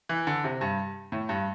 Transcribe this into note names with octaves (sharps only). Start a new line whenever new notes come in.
E3
D3
C3
G2
A2
G2